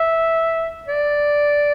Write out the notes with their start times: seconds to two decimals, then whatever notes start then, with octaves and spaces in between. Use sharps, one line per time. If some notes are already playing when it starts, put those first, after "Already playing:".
Already playing: E5
0.88 D5